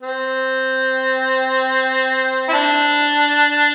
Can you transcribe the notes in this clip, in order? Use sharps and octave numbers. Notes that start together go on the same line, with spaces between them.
C4
E4
D4